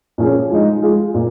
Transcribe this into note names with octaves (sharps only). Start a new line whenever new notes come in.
A#2 F3 C#4 G#4
F3 G#3 D#4
G#3 F4 G#4
A#2